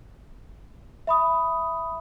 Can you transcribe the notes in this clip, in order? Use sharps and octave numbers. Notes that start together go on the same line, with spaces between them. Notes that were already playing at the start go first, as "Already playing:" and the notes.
E5 B5 D#6